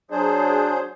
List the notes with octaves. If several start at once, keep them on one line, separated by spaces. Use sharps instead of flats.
F#3 D4 G#4 C5